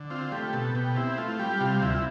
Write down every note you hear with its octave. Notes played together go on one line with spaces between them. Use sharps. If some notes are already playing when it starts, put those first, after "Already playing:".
Already playing: D3
C4 F4
A3 G4
B2 A4
B2 G4
C4 E4
A3 F4
G3 G4
C3 F4
D2 E4